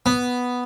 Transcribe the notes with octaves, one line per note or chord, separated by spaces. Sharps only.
B3